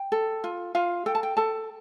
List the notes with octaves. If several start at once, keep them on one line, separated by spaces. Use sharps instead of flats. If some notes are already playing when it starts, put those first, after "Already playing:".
Already playing: G5
A4
F4
F4 F5
A4 G5
A5
G5
A4 A5